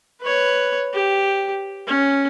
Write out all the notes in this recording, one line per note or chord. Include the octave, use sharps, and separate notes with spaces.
B4 C#5
G4
C#4